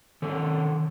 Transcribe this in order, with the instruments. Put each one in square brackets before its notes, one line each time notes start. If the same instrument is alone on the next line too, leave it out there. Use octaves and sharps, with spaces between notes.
[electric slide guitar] D#3 A4 C#5